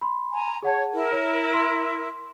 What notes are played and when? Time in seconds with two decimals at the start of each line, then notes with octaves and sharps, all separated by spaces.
0.01 B5 C6
0.32 G#5 A#5
0.63 G#4 C#5 F#5 A5
0.93 E4 A#4
1.12 C#5
1.53 C6